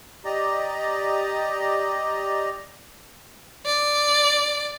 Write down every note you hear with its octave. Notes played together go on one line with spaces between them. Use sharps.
G4 D5 D#5 A#5
D5